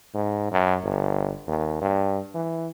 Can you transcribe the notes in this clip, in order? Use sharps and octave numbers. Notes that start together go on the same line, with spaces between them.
G#2
F#2
G1
D#2
G2
E3